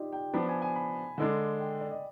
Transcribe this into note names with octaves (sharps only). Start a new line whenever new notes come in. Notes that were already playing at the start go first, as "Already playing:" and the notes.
Already playing: D#4 F4 G4 D5 D#5
G5
F3 B3 D4 B5
G#5
G#5
B5
D3 G#3 D4
G5
D5
D#5